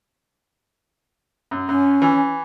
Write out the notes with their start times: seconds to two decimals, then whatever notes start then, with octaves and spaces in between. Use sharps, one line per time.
1.51 F#2
1.69 F#2 C#4
2.02 E3